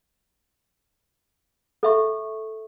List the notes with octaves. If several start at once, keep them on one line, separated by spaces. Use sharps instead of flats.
A4 E5 C#6